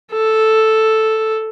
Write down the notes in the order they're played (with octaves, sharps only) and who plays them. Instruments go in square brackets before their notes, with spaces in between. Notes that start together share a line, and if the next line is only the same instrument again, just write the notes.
[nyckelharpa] A4